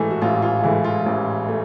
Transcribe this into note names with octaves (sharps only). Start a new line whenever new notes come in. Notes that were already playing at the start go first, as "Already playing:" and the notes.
Already playing: A1 G#2 E3 A3
F#4
A1 F4
F4
G#2 E3 A3 E4
F4
A1
A3